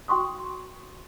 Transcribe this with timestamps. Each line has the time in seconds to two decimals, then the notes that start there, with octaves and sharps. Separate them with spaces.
0.08 F#4 G5 C6 C#6 D#6